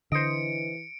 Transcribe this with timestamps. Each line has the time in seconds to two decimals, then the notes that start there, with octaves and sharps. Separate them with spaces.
0.12 D3 E3 C5 D#5 C#7 D7